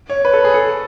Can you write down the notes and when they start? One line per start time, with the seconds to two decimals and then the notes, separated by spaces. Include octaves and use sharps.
0.10 C#5
0.25 B4
0.33 A4
0.44 G#4
0.54 A4